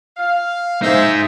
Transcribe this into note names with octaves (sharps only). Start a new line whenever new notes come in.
F5
D#4 G#4 C5 E5